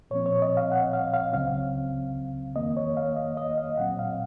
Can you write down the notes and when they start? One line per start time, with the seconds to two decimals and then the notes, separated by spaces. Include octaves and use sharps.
0.11 A#2 F3 C4 C#5
0.26 C#5
0.42 D#5
0.57 F5
0.72 F#5
0.93 F5
1.13 F5
1.33 C#2 C#3 F#3 C4 F5
2.56 F2 D#3 A#3 D#5
2.77 C#5
2.97 F5
3.16 D#5
3.37 D#5
3.58 F5
3.78 A#2 F#3 C4 F#5
3.99 F5